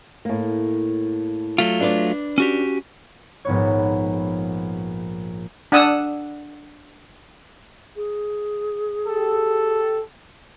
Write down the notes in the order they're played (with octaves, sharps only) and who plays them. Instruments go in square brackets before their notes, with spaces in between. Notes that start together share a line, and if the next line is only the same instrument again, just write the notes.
[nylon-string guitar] A2 A#3
[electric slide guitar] F#3 A3 F4
[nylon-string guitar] D4 B4 D5
[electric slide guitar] C#4 F#4 G4
[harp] A#1 G#2 B3 C#5
[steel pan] D4 F#5 D#6 E6
[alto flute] G#4
[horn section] G4 A4